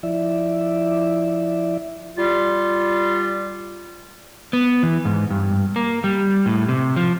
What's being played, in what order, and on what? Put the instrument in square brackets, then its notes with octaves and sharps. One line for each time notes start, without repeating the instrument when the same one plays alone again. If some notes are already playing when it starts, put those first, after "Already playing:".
[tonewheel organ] F3 E4 D5 E5
[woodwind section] G3 F4
[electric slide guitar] B3
E3
G#2
G2
A#3
G3
A2
C3
F3